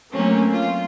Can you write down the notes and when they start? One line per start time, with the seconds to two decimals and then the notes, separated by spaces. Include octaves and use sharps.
0.14 F#3 A3 A#3 C4 C#4
0.53 F4